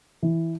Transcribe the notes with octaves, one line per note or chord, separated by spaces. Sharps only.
E3